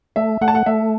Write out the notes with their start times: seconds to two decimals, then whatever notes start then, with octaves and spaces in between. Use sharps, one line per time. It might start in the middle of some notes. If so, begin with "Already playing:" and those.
0.16 A3 E5
0.41 A3 F#5
0.48 A5
0.55 F#5
0.66 A3 E5